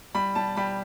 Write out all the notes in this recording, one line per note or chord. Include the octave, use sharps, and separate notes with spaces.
G3 B5
G3 A5
G3 B5